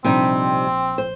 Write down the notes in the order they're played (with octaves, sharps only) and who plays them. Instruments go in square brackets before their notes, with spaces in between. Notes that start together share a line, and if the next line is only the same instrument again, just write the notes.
[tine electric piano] A#1 [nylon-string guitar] C3 G3 D#4 [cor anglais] C4
[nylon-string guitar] C5